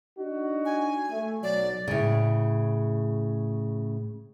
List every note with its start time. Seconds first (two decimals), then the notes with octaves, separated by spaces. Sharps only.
0.19 D4 D#4 F#4
0.65 G#5
1.10 A3
1.43 B1 B2 F#3 D5
1.88 A2 C#3